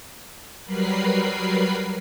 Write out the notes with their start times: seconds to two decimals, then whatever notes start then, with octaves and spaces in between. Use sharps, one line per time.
0.65 F#3 G3 A#4 B4 B5 C7